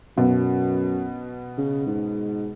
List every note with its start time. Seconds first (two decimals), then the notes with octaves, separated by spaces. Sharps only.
0.18 F#2 B2
1.58 C#3
1.87 G#2